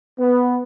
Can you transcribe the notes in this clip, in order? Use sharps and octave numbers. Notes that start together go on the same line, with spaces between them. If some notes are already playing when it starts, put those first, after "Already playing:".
B3